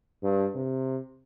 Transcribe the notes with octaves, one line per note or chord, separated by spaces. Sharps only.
G2
C3